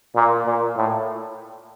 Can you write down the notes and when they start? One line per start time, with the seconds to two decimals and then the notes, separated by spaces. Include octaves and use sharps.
0.16 A#2
0.46 A#2
0.77 A2